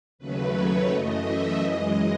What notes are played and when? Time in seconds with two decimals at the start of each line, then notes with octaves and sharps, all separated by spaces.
0.19 D#2 C#3 F#3 A3 B4
0.54 C#5
0.90 F#2 E3 A3 D#5
1.25 E5
1.60 F#2 E3 G#3 D#5